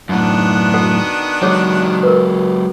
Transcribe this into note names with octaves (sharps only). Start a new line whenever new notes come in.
F#2 A2 D#3 B3 D4
F#4 A4 F#5
F#3 G#3 G#4 C#5 F#5
A#4 B4